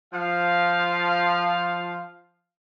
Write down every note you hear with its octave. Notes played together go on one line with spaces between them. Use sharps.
F3 F5